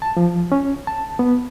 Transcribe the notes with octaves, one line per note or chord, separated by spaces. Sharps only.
A5
F3
C#4
A5
B3